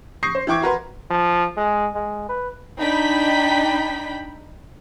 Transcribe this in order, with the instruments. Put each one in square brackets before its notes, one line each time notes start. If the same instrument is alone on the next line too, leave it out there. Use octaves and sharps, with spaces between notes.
[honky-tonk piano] C#6 D#6 G6 A#6 C7
C5
E3 E4 G5 C#6 D6 G#6
F#4 A#4 B4 C6
[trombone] F3
G#3
G#3
B4
[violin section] D4 D#4 G5 B5 B6